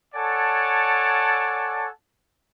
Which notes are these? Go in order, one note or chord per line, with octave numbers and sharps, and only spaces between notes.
A4 C#5 D5 F#5 G#5 A5